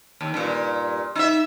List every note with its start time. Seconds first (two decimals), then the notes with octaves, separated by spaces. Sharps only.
0.21 D#2
0.34 G2 A#2
1.15 D#4 E5